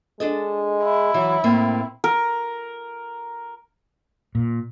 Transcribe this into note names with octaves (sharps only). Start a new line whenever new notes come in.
G#3 D4 A4 D#5
E4
E3 F#3
A2 A#3 C4
A#4
A#2